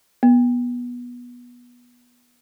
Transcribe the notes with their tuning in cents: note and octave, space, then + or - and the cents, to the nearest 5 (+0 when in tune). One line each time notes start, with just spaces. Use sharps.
B3 -20